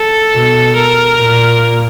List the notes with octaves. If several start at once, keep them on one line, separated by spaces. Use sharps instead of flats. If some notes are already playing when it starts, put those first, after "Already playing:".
Already playing: A4
B2
A#4
A#2